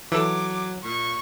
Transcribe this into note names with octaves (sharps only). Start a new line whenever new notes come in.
E3 F#3 A4 D6
A#2 C#6